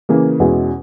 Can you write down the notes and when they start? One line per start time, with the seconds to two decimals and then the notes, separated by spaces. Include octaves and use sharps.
0.09 C#3 E3 A#3
0.39 E2 B2 G#3 C#4 E4